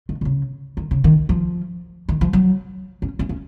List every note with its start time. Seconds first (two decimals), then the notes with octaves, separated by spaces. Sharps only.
0.09 D#3
0.21 D#3
0.25 C#3
0.77 D#3
0.91 C#3
1.04 D#3
1.29 F3
2.09 D#3
2.21 F3
2.33 F#3
3.02 C#4
3.19 C#4
3.29 C#4